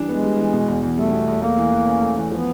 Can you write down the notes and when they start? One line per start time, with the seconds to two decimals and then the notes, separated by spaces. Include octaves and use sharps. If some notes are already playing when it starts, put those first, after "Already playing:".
Already playing: E3 G3 D4
0.08 G#3 B3
0.23 G3
0.38 E3
0.53 B2
0.68 E2
0.83 E2
0.97 G3 A3
1.12 B2
1.28 E2
1.42 A3 A#3
1.57 E3
1.72 E3
1.86 C#4
2.01 A3
2.16 E3
2.31 F3 B3